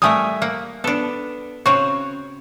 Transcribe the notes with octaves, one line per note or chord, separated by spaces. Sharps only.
G3 A3 A#4 E5 G#5 D#6
A#3 F#5
B3 D4 A4
C#3 C4 F#4 C#5